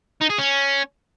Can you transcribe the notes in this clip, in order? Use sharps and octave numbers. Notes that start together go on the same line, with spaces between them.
D#4
G#4
C#4